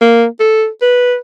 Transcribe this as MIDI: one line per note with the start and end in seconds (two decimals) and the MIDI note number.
0.01 0.25 58
0.40 0.67 69
0.82 1.15 71